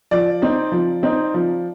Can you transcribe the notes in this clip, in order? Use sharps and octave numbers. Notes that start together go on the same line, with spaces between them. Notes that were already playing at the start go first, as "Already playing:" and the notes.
F3 D5
C4 D#4
F3
C4 D#4
F3